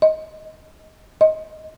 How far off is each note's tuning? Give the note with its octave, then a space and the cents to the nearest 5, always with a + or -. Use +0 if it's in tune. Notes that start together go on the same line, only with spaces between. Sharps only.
D#5 +15
D#5 +15